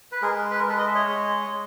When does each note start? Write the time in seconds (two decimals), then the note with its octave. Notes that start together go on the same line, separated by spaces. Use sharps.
0.12 B4
0.22 G#3 G#4 A#4
0.51 B4
0.59 A#4
0.64 G#3
0.69 A4 B4
0.79 D#5
0.86 E5
0.94 C#5 D#5
1.06 G#3
1.48 G#3